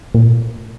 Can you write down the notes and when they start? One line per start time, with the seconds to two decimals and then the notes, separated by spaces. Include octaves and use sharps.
0.14 A#2